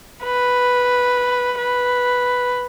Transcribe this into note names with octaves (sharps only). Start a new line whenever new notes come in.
B4
B4